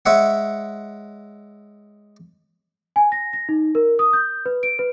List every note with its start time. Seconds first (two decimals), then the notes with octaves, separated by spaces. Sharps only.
0.06 G#3 C#5 E5 F#5
2.96 G#5
3.12 A#6
3.33 A#6
3.49 D#4
3.75 A#4
3.99 D#6
4.13 G6
4.46 B4
4.63 D7
4.79 B4